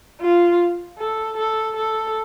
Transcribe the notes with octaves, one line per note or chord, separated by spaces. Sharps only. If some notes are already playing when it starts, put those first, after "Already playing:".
F4
A4
A4
A4